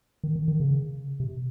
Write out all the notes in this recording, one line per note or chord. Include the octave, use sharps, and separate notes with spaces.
D#3
D#3
D#3
C#3
C3